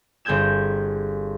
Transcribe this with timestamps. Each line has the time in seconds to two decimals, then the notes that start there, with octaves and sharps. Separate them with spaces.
0.25 G1 C4 G#4 G6 G#6 E7